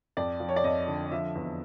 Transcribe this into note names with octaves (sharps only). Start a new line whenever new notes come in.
F2 D5
F3
C#5
D5
F2 D#5
D3
F3 E5
E2